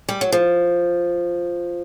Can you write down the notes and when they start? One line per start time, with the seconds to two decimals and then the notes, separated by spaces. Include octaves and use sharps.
0.09 G3
0.21 F#3
0.32 F3